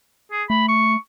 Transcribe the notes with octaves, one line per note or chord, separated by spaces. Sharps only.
G#4
A3 B5
C#6